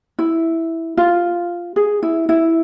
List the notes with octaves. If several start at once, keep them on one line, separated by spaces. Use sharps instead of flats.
E4
F4
G#4
E4
E4